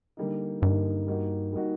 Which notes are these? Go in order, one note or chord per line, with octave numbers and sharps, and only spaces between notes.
D3 G3 A#3 D#4
G2 D3 G3 A#3 D#4
G3 A#3 D#4 F#4
G3 A#3 D#4 F#4